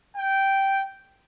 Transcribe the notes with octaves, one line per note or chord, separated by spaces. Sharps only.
G5